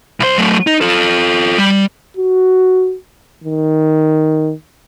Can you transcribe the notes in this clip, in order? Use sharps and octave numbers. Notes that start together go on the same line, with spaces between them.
C2 C5
F#3 A3
D#4
F4 A4
G3
F#4
D#3